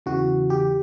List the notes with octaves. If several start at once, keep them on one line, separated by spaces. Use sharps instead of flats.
E2 C#3 E3 F#4
G4